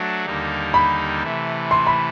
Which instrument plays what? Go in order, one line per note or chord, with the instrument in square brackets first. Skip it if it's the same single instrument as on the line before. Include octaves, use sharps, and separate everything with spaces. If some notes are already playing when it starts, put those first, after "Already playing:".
Already playing: [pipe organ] F#3 A3 D4 F#4
D#2 D3 G3 A#3 D#4
[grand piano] B5
[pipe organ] C3 E3 A3
[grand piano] C6
B5